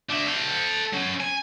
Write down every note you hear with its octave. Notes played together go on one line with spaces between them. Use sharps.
D4 E5
A4 F5
F#3 C#4
G#5